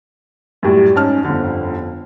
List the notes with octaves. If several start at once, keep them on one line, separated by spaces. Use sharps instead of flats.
F#2 A2 G3 G4
G#2 C#4 A5 F6
G1 F2 D3